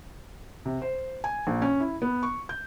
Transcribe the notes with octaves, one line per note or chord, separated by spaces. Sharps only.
C3
C5
G#5
A#1
C#4
E4
B3
C#6
G6